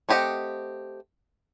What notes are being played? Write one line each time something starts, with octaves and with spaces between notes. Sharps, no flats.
A3 C4 G4 D#5 F#5